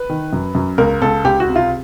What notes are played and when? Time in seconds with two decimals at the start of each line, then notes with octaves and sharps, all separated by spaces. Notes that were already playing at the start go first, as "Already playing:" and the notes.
Already playing: B4
0.10 D#3
0.33 F#2
0.55 F#2
0.78 C#2 A#4
1.02 C#2 A4
1.25 C#2 G4
1.40 F#4
1.48 C3
1.56 F4